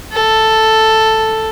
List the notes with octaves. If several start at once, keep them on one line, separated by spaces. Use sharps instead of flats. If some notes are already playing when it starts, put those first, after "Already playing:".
A4